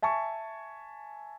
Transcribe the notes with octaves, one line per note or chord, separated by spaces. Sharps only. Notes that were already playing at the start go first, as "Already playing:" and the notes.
E5 G#5 A5 C#6